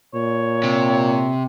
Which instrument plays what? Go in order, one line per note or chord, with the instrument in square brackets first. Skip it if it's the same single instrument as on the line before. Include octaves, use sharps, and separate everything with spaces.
[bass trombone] A#2 [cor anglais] C#5
[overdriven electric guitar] C3